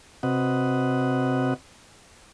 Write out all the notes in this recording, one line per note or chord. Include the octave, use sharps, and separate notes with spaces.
C3 C4 F#4 B4 D#5 F#5